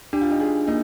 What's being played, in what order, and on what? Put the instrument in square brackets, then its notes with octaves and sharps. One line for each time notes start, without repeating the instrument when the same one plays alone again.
[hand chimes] D4 [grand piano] G4
[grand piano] F4
D#4 G4
[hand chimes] D4 [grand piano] F4 G#4
[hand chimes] A#3 [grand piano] D#4